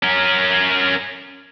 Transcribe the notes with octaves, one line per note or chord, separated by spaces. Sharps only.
C#4 A#4